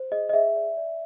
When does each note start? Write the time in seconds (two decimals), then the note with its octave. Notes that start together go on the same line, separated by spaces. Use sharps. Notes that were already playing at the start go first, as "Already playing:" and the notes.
Already playing: C5
0.12 G#4 D#5
0.29 D#5
0.33 G#4 E5
0.56 D5
0.77 D5